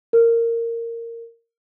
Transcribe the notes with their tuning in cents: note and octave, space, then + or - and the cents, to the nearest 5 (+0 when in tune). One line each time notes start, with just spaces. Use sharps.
A#4 -15